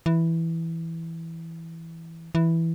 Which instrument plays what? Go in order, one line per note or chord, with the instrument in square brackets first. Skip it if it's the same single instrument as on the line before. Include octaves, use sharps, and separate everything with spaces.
[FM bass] E3
E3